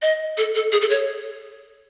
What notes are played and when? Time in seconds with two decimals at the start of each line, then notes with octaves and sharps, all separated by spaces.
0.02 D#5
0.37 A4
0.55 A4
0.72 G#4
0.81 A4
0.90 C#5